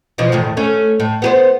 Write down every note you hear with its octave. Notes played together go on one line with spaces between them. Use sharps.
B2 E3 F3
E2 A2 D#3
A3 C#4
A2
B3 G4 C5